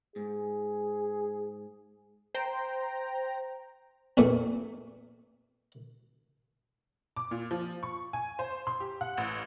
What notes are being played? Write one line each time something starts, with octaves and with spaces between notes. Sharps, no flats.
G#2 G#4
C5 G5 A#5
A1 E2 A#2 A3
D6
A#2
F3
C#6
G#5
C5
C6
G4
F#5
A1